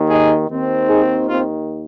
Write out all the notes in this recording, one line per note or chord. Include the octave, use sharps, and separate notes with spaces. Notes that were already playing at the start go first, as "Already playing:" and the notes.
Already playing: D#2 D#3
D#4 G#4
D#2 D#3 C4
D#4 G#4
C4 F4